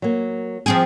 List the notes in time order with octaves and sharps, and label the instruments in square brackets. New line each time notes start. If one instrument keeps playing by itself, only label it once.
[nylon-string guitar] F#3 A#3
[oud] F3 C4 G#4